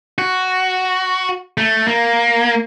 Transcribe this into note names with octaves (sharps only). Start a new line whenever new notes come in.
F#4
A3
A#3